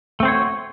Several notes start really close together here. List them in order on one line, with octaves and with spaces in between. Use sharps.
A3 C4 C5 C#5 F#4